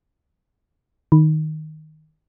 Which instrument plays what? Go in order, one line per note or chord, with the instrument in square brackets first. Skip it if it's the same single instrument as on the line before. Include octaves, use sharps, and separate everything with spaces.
[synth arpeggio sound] D#3